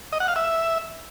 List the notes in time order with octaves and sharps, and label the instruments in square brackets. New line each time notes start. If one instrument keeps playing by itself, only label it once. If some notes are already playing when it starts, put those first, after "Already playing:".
[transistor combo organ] D#5
F#5
F5
E5